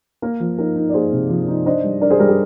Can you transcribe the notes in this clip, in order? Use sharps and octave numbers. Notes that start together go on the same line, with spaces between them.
A#3 A#4
F3
D#4 A#4
D#4
D5
A#3 G#4 C5
C3
F3
D#4
D4 C5 D#5
G3
D4 A#4 D5
G#4 C5
G3 A#4
G#4